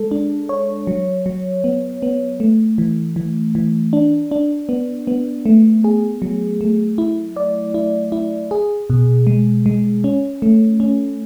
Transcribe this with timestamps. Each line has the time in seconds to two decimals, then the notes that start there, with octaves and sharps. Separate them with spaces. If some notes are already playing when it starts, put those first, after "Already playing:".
Already playing: G#3 A4
0.11 D4
0.49 C#5
0.87 F#3
1.26 F#3
1.64 B3
2.03 B3
2.40 A3
2.78 E3
3.16 E3
3.55 E3
3.93 D4
4.31 D4
4.69 B3
5.07 B3
5.46 A3
5.84 G#4
6.22 F#3
6.61 A3
6.98 E4
7.36 D5
7.74 E4
8.12 E4
8.51 G#4
8.90 B2
9.27 G#3
9.66 G#3
10.04 C#4
10.42 A3
10.80 C#4